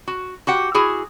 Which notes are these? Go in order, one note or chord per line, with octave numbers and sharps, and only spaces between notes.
F#4
F#4 G4 F#5
E4 F#4 G#4